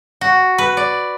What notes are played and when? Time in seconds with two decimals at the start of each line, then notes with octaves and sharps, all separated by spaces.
0.21 F#4
0.58 B4
0.77 D5